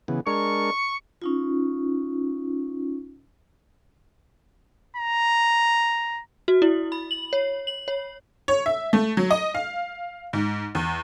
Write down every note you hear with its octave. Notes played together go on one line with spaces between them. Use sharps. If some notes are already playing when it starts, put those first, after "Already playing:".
C#3 E3 B3
G#3 D4 A#4 C#6
C#4 D#4 F4
A#5
F#4
E4
B5
F#7
C#5
F#7
C#5
C#5
E5
A3
F#3
D#5
F5
G#2
E2